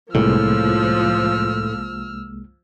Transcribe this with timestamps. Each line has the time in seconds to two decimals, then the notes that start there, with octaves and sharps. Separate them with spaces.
0.15 C2 A2 F3 G#3 A#3 E6 F6